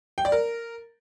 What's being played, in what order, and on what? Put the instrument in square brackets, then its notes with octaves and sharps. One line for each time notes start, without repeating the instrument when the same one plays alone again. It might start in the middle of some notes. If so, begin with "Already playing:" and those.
[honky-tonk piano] G5
D5
A#4